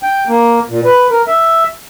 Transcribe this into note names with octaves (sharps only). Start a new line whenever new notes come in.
G5
A#3
A#2
B4
A#4
E5